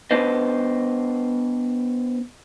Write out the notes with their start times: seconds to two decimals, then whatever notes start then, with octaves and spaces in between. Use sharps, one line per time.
0.11 B3 D4 B4 C5 D#5